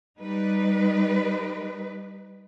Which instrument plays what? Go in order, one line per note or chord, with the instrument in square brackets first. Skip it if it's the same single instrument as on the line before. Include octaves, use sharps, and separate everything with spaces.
[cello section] G3 D#4 B4